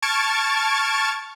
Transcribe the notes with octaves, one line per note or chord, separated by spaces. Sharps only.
A5 C#6 F6 G#6 A6 D7